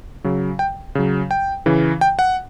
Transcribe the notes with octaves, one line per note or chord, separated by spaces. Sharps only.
C#3 F#3
G5
C#3 F#3
G5
C#3 E3
G5
F#5